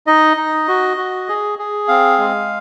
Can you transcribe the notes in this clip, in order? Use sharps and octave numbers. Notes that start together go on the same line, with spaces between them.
D#4 D#5
D#4
F#4
F#4
G#4
G#4
C4 F5
G#3